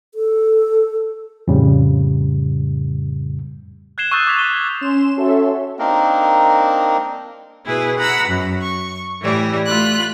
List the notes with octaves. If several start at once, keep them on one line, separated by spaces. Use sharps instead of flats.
A4
F2 A2 C#3 G3
F#6 G#6 C7 E7 G7
C#6 D#6 E6 F#6 G6 A6
D6 G#6 B6 F7
C#6 F#6 G7
G#6
C#4 C6 E7
C#4 F#4 A4 C#5 E5 C6
A#3 C4 D4 D#4 A#4
B2 E4 G#4 B4
F#5 A#5 B5 E6
F#2
C#6
A2 E3 G3
A3 F4 B5 F#6